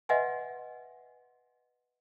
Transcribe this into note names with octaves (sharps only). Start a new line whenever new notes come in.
B4 D#5 E5 F#5 G#5 C6